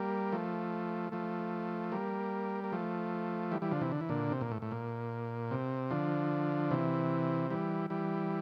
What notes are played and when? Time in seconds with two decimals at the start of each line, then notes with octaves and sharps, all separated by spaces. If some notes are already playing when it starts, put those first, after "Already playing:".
Already playing: G3 A#3
0.32 F3 A3
1.12 F3 A3
1.92 G3 A#3
2.64 A#3
2.72 F3 A3
3.51 E3 G3
3.62 E3 G3
3.71 D3 F3
3.81 C3 E3
3.92 D3
4.01 E3
4.09 A#2 D3
4.32 C3
4.41 A#2
4.52 A2
4.62 A2
4.71 A#2
5.51 C3
5.91 D3 F3
6.71 C3 E3
7.51 E3 G3
7.90 E3 G3